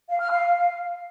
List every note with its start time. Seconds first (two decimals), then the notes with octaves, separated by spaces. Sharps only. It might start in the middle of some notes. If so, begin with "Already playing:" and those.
0.09 F5
0.20 F6
0.31 F5